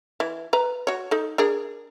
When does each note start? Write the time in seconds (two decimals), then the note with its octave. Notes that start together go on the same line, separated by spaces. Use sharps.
0.20 E3
0.53 B4 A#5
0.87 F#4 C#5
1.11 D#4 A4
1.38 D4 G#4 A#4